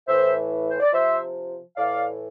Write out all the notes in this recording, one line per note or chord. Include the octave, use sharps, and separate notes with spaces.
A2 E3 C5 E5
C5
D5
C3 F3 C5 E5
A2 E3 D5 F5